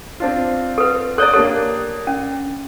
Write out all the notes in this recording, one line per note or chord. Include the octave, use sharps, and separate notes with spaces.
C4 D4 F4
A4 B4
A4 C#5 D5 D#6 F#6
A#3 D4 G4 A4
C#4